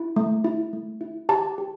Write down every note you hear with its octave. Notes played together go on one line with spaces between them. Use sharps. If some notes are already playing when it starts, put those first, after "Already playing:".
Already playing: E4
A3
E4
A3
E4
G4 A5
G4